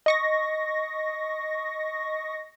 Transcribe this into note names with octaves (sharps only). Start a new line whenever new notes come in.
D#5 C#6 A#6